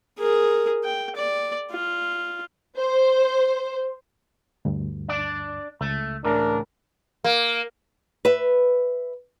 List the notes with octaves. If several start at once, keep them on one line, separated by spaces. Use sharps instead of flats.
G#4 A#4
G5
D5
F4
C5
D2 G2
D4 D5
C#2 A3
A2 C#3 E3 D4 A#4
A#3
B4 E5